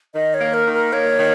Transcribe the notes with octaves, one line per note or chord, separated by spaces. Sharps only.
D#3 D#5
C#5
A#3
A#4
D#3
A#4
A#3 C#5
D#3